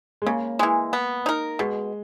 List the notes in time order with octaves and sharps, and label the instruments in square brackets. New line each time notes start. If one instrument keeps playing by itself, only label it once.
[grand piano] G#3
[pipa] C#3 [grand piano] A#3
[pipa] E3 G#3
B3
D#4 A#4
[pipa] B2 [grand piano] G#3